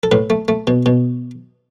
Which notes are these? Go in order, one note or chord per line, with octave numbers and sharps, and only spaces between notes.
A4
A2 B4
A3
A3
B2
B2